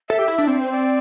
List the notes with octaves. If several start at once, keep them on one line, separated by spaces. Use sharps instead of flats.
A4 E5
G4
E4
D4
C4 D5
C5
D5